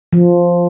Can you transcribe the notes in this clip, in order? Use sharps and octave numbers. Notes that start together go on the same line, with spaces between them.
F3